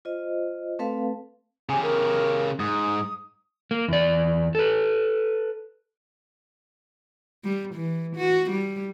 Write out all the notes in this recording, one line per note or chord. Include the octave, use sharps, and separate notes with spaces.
F4 C5 D#5
A3 C4 A4 B4 F5 A5
C#3 G4 G#5
A#4
G#2 D#6
A#3
E2 D5
A4 B4
G3
E3
F#4
G3